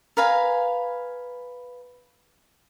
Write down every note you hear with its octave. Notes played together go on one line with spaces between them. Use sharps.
A#4 B4 F5 G#5